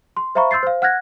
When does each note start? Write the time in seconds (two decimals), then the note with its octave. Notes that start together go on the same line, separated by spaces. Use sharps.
0.17 C6
0.35 C5 E5 F5 A#5 B5 C#6
0.51 C6 E6 G6 A6 C7
0.63 C5 F5
0.82 F#5 F6 F#6 G#6 A#6